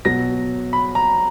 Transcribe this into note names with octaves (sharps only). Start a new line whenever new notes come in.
B2 F#3 A#6
B5
A#5